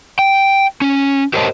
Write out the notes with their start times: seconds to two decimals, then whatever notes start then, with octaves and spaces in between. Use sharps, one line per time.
0.19 G5
0.81 C#4
1.33 G4 A#4 C5 C#5 D#5 A5